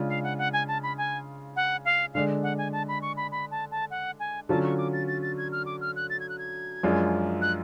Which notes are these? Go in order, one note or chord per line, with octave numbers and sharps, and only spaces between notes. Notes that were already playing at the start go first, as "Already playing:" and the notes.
Already playing: C#3 G#3 D4 F4
F5
F#5
F#5
G#5
A5
B5
G#5
F#5
F5
D3 G#3 D4 F5
F#5
G#5
A5
B5
C#6
B5
B5
A5
A5
F#5
G#5
D3 F#3 C#4 F4 A5
C#6
D6
A6
A6
A6
G#6
F6
D6
F6
F#6
A6
G#6
F#6
G#6
F#2 F3 G#3 D4 F4
F#6